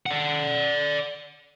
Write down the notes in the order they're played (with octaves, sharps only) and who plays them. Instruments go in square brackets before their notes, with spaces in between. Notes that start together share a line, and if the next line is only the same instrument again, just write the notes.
[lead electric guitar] D5 F#5